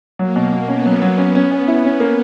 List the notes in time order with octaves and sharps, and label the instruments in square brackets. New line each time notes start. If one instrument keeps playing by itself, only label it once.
[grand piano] F#3 [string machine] A#3
[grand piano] B2
B2
[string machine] B3 [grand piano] C#4
[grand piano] F#3
F#3
[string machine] B3 [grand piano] C#4
[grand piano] C#4
C#4
E4
C#4
A#3